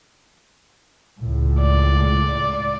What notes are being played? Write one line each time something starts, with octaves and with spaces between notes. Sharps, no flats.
C#2 A2
D5